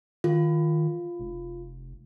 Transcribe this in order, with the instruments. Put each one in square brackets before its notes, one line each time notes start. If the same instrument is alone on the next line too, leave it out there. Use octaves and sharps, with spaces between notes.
[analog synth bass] D#3 [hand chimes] F4
[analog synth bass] F1